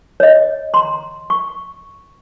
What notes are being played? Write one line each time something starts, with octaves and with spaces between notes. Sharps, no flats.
C#5 D#5
A#5 C6
C#6